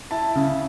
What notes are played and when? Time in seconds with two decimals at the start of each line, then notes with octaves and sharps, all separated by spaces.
0.11 E4 A5
0.35 C#3